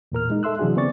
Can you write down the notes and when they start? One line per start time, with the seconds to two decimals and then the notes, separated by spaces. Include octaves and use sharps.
0.12 E2 A#2 A#4 F6
0.30 G#3 D#4
0.43 A4 E5 C6 E6 F#6
0.59 C3 E3 F#3 D4 F#4 G#4
0.76 C#3 B3 C4 D5 C#6 A6